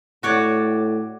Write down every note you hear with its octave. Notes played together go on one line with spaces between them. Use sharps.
A2 F#4 C#5 D5